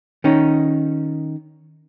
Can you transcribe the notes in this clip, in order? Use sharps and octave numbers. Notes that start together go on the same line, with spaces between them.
D#3 C#4 D#4